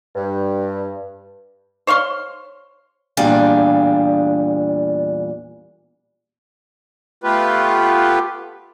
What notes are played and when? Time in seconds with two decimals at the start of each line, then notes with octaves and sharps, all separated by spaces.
0.16 G2
1.87 C5 C#5 F5 C6
3.17 E2 A#2 G3 D4 G#4 F5
7.24 A3 B3 F4 G4 B4